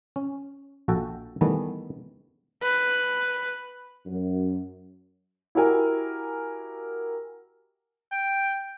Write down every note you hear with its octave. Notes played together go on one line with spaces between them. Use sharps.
C#4
A#1 F#4 A4 G5
D#3 E3 G3 A3 B3
B4
F#2
E4 F#4 G4 A#4 G#5
G5